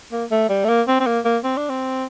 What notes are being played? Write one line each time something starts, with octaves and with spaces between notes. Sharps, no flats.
A#3
A3
G3
A3
A#3
C4
C4
A#3
A#3
C4
D4
C4